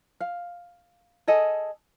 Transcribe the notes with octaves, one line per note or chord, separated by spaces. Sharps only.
F5
G#4 A4 D#5